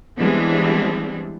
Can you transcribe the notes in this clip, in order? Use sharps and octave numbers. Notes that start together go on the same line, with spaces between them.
E3 G3 G#3 B3 C4 D4